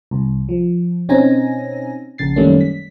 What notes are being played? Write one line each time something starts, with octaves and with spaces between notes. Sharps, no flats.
C2
F3
B2 C4 C#4 D#4 G#5 A#6
A#1 C#3 A6 C7
F#2 D#3 G3 A3 A#3 C#4
B6